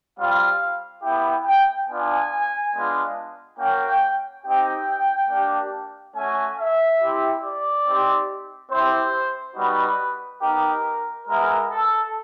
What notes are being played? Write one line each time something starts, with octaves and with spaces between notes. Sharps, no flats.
G3 C4 F4 F5
B3 E4 G4 G5
G5
B3 D4 F4 G#5
G#3 B3 D4 F4
A#3 C#4 F#4 G5
C4 D#4 G4 G5
A#3 D4 G4
A3 C#4 F#4 G#5
E5
C4 E4 G4
D5
C4 D#4 G4
C4 E4 G4 C5
G3 B3 D#4 F#4 B4
B3 D#4 G4 A#4
G#3 B3 E4 A#4
A4